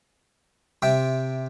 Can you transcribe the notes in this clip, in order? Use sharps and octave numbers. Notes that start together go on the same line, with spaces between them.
C3 E5 G5